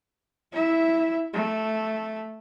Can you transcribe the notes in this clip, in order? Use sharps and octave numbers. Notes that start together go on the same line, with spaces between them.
E4 E5
A3